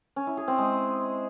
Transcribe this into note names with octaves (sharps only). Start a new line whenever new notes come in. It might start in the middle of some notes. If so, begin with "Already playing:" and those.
C#4
E4
G#4
C4
G#3